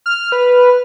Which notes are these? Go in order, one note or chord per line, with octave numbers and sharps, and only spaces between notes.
F6
B4